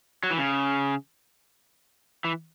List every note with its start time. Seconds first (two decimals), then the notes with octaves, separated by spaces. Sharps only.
0.23 F#3
0.31 E3
0.38 C#3
2.24 E3